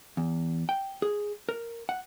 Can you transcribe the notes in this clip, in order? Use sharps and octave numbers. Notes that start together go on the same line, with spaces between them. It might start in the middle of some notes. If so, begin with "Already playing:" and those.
E2
G5
G#4
A#4
F#5